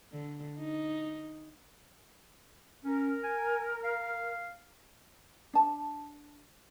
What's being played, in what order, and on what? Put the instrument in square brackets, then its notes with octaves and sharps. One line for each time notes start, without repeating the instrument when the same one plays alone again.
[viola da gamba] D3
D#4
[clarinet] C#4 [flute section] A#4
[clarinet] G#5
F5
[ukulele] D4 A5